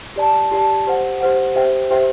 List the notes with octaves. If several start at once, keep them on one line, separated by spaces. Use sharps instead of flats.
G4 D5 A5
G4 D5 A5
G4 C5 F#5
G4 C5 F#5
G4 C5 E5 G5
G4 C5 E5 G5